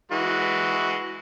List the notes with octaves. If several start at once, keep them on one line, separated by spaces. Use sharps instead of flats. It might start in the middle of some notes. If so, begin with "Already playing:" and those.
E3 G#3 F#4